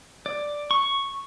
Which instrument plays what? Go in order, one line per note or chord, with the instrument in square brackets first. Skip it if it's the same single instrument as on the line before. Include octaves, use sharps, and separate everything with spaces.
[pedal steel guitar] D5
C#6